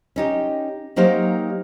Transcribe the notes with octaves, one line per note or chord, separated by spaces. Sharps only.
C#4 D#4 G4
F#3 A#3 D#4 G4 C5 F5